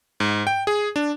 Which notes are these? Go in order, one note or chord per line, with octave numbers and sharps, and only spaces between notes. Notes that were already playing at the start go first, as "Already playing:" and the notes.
G#2
G5
G#4
D4